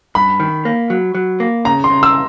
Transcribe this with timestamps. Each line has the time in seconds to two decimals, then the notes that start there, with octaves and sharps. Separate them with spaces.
0.15 G2 B5
0.40 D#3
0.65 A#3
0.90 F#3
1.15 F#3
1.40 A#3
1.65 C#3 A#5
1.84 C6
1.90 C#3
2.03 E6